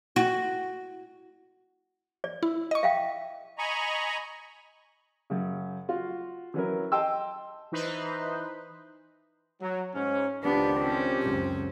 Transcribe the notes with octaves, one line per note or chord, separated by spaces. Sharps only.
F#4
D5
E4
D#5 C#6
E5 F5 G5
D#5 G#5 A#5 B5 C#6
F#2 C#3
F4 F#4 F5
E3 F#3 C#4 E4 A#4
D#5 G5 A5 C6 E6
E3 D#4 B4 C5
F#3
G#2 C#4
C#2 D#3 F3 B3 D4 G4
C4 C#4
C#2 F#2